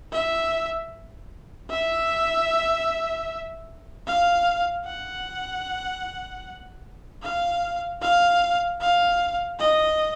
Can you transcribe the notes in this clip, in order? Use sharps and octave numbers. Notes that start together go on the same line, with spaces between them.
E5
E5
F5
F#5
F5
F5
F5
D#5